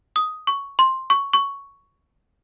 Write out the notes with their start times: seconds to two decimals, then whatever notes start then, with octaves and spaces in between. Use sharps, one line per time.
0.16 D#6
0.47 C#6
0.79 C6
1.10 C#6
1.33 C#6